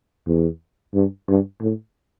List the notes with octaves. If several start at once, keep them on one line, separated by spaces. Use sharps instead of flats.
E2
G2
G2
A2